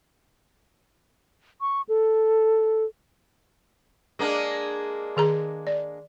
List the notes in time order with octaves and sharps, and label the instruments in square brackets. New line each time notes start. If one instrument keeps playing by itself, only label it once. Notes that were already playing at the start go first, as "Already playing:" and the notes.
[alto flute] C#6
A4
[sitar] G#3 A#3 D4
[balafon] D#3 G#4 A#5
D5